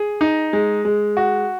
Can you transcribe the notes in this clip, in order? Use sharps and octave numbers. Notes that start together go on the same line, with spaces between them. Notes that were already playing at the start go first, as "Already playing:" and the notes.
Already playing: G#4
D#4
G#3
G#3
F#4